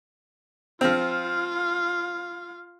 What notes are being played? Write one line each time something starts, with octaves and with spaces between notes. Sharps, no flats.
F3 C4 F4 F5